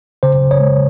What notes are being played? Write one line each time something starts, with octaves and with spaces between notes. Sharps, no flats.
C#3 C5
C#3
C#5
G#3